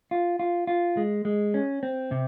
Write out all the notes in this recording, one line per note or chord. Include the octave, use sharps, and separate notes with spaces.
F4
F4
F4
G#3
G#3
C#4
C4
C3